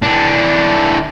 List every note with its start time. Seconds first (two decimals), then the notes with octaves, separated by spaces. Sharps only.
0.03 E3 D4